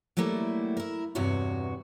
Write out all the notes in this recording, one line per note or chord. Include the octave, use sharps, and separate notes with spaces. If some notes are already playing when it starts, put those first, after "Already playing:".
F#3 G3 A3 A#3 E4
E4 A#4
E2 G2 C3 F#4 C#5